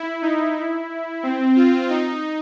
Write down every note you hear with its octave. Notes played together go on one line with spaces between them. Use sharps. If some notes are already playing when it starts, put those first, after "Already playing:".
Already playing: E4
D#4
E4
C4
F4
D#4